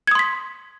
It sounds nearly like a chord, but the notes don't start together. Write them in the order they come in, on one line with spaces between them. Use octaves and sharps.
G#6 D#6 C6 B6